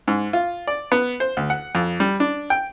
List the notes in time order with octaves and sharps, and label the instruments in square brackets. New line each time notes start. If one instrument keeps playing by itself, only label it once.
[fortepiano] G#2
F4
D5
B3
C5
D2
F#5
F2
G3
D4
G5